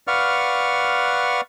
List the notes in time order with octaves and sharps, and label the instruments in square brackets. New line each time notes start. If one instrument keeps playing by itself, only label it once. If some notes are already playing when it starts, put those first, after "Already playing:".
[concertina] B4 D5 F5 F#5 C#6 F6